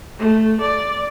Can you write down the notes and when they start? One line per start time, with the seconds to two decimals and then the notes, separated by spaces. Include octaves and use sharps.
0.19 A3
0.61 D5